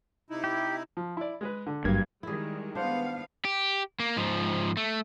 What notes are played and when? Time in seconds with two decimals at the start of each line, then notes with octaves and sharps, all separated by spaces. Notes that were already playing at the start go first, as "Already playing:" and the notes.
0.30 C3 D#4 E4
0.44 G4
0.97 F3
1.17 E4 D5
1.41 G#3 G#4 B4
1.67 D3
1.85 G#1 G2 F#3 A#3 G#6
2.23 D#3 G3 G#3 E4 G#4
2.75 B3 D4 C5 F5 F#5
3.45 G4
4.00 A#3
4.17 G#2 F3
4.77 A3